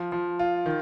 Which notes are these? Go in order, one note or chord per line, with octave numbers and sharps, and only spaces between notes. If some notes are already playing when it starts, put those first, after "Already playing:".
Already playing: F3
F3
F4
D#3